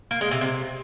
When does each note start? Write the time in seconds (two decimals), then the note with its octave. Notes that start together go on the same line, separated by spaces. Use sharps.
0.11 A#3
0.21 G#3
0.31 C3
0.41 C3